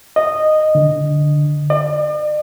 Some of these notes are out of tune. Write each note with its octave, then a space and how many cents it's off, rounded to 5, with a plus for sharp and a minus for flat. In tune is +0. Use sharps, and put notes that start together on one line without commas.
D#5 -10
D3 +0
D5 +45